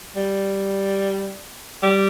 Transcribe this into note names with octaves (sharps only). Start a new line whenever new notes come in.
G3
G3